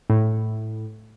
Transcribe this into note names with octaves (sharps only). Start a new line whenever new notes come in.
A2